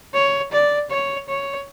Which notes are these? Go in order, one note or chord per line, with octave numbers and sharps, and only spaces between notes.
C#5
D5
C#5
C#5